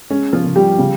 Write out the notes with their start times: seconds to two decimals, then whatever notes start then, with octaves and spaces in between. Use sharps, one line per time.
0.10 G#3 C#4
0.33 F3 F4
0.44 C#3
0.56 G3 G4
0.79 C#3